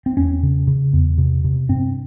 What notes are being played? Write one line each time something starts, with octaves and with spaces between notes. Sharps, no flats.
C4
E2 C#4
C#3
C#3
E2
C3
C3
G2 C4